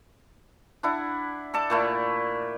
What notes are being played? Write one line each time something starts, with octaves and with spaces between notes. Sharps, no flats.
D4 E4 F#5
A4 D5 A5 D6
A#2 A3 E4